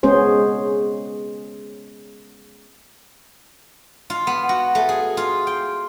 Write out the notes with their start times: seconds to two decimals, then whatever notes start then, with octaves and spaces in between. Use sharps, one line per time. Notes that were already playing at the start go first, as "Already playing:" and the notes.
0.03 G#3 B3 C#4 G#4 C5
4.10 F4
4.27 B3
4.49 F#4
4.75 A3
4.89 G#4
5.17 F4
5.47 G5